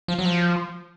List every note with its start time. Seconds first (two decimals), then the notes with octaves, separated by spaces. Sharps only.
0.08 F3
0.18 F#3
0.25 F3